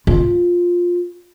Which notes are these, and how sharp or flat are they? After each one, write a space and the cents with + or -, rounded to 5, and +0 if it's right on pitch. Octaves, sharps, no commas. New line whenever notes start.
F4 +10